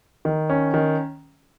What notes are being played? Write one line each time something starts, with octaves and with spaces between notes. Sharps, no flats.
D#3
C#4
D#3